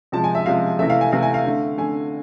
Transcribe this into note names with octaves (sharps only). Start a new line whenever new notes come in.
C3 F3 G#3 A5
G#5
E5
C3 F3 G#3 F5
C3 E3 A3 E5
F5
G#5
C3 E3 A3 F5
G#5
F5
D3 A3
D3 A3 G#5